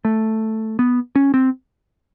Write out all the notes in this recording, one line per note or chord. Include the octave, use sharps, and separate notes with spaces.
A3
B3
C#4
C4